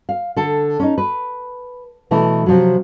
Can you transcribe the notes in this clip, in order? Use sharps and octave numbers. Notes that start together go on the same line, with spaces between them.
F5
D3 A4
C#4 D#4
B4
B2 E3 A3 E4
C3 F3 F#3